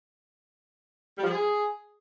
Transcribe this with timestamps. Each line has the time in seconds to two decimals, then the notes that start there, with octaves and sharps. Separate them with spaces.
1.17 G3
1.23 F3
1.28 G#4